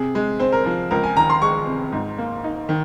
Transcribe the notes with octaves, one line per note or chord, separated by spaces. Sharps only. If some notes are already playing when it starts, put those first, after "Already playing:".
Already playing: C3 G#4
G#3
C4 C5
A#4
F3 C5
C#2 A#4
G#5
D#3 A#5
C6
G#3 C#6
C3
G#2
A#3
D#4
D#3